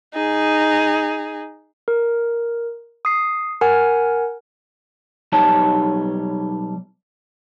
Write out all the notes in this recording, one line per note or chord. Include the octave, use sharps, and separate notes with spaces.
D#4 G#4
A#4
D#6 C7
A#4 F#5 G#5 F6
B1 G3 D#4 C#5 A5